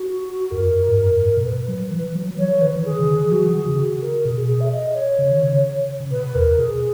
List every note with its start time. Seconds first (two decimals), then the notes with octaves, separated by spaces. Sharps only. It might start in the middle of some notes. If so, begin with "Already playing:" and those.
Already playing: F#4
0.51 F#2 A#4
0.88 G#2
0.98 F#2
1.22 G#2
1.36 B2
1.41 A#4
1.45 A#2 B4
1.68 F#3
1.92 E3
2.15 F#3
2.31 F#3
2.38 E3 C#5
2.61 D#3 B4
2.76 E3
2.85 D#3 G#4
2.99 C#3
3.08 D#3
3.26 E3
3.31 F#3 F#4
3.43 E3
3.55 D#3 G#4
3.66 C#3
3.79 F#4
4.02 A#4
4.25 B2 G#4
4.37 G#4
4.48 G#4
4.60 E5
4.72 D#5
4.95 C#5
5.19 C#3
5.31 D#3
5.44 C#3
6.00 C#3
6.11 B2 B4
6.35 E2 A#4
6.59 B2 G#4